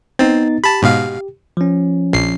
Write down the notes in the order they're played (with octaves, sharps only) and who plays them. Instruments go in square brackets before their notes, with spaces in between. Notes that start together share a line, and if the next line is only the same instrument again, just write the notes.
[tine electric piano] B3 D#4 A6 [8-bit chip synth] C4
[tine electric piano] G4 [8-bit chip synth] A5 B5
[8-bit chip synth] G#2 B2 F5
[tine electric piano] F3 C#4
[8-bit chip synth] A#1 C7